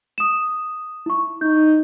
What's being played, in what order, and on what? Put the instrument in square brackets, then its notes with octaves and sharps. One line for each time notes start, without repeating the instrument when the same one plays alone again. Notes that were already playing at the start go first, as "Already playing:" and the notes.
[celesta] D#6 E7
E4 C#6
[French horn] D#4 [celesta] G6